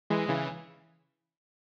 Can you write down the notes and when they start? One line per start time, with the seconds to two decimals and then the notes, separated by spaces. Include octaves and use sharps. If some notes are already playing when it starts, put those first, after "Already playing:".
0.10 E3 G#3
0.29 C#3 E3